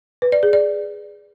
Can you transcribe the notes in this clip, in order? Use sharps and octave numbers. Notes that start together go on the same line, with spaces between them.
B4
D5
G#4
D5